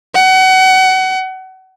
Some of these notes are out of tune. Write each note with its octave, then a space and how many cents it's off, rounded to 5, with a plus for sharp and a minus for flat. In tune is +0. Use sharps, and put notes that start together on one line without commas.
F#5 +30